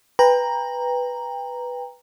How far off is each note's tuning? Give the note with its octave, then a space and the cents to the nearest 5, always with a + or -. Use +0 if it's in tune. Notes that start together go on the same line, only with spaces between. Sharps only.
B4 +0 G5 +30 A#5 +0